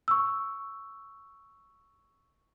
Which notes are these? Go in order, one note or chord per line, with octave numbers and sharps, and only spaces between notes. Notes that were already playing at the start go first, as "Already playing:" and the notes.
C#6 E6